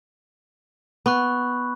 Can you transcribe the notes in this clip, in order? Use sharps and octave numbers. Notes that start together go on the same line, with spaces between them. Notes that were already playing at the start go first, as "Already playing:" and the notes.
B3 B5 C#6 F#6